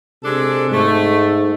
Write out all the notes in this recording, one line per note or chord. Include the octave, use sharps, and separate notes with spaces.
C3 G#3 D4 A4
G#2 A3